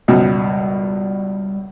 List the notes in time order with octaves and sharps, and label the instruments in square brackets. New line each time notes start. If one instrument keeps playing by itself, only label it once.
[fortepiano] C#2 F#2 B2 [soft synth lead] G3